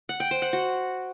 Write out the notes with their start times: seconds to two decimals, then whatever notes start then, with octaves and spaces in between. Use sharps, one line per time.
0.09 F#5
0.20 G5
0.31 C5
0.42 F#5
0.53 F#4